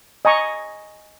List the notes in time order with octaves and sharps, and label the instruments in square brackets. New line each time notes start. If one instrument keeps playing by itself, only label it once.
[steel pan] D#5 G#5 A#5 C#6